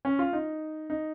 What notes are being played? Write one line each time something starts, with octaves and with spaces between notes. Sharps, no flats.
C#4
F4
D#4
D#4